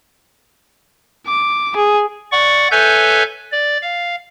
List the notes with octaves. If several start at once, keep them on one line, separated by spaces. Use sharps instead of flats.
D6
G#4
D5 F#5 C#6
A4 B4 C#5 E5 G#5 G6
D5
F5